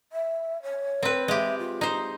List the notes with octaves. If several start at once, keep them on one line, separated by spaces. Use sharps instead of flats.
E5
C#5
C4 B4
G#3 G4 E5
F4
D#4 C5